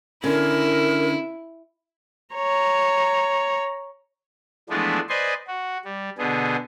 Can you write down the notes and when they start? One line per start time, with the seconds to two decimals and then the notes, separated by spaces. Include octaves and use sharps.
0.24 D3 C#4 E4 A#4
2.35 C#5 A#5
4.70 E3 F3 G#3 A3 B3 D4
5.09 B4 C5 D5 D#5 G#5 C6
5.47 F#4
5.85 G3
6.18 B2 D3 B3 G#4